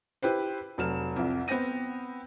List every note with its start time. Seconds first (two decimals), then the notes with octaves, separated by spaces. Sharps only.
0.22 E4 G4 B4 C5
0.78 F1 F#3 F6 E7
1.16 C2 F2
1.48 B3 C4 G5 A#6 D#7